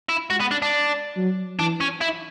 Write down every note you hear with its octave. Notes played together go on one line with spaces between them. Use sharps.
E4
G#3 F#4
B3
D4
D4
F#3
E3 D4
C#4
E4